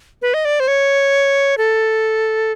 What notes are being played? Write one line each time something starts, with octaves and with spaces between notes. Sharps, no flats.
B4
D#5
D5
C5
C#5
A4